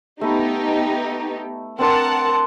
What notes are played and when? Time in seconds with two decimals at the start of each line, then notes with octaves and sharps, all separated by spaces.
0.21 A3 B3 D#4 G4 B5
1.79 C4 D4 A#4 C5 F#5 A5